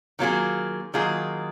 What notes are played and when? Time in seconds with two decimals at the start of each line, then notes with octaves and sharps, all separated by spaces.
0.19 D#3 F#3 A#3 F4 G#4
0.94 D#3 F#3 A#3 F4 G#4